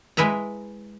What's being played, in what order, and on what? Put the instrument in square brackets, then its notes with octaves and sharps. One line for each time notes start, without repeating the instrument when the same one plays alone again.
[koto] G#3 E4 B4 E5 A#5